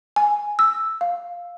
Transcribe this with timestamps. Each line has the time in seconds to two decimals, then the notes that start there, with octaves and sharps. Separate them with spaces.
0.16 G#5
0.59 E6
1.01 F5